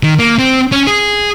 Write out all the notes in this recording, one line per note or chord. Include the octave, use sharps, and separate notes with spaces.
D#3
A#3
C4
C#4
G#4